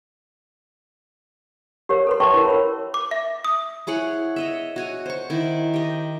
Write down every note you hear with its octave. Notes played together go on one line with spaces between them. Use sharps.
G4 A#4 C#5
A4 B4 C6
C#5 E5 G5 A5 C#6
E4 A#4
A#4 C#5 B5
D6
E5
D#6
E4 G#4 C#5 F#5
C#5 D#5 E5
F#4 C#5 G#5
C5 C#6
D#3 E4
G4 D#5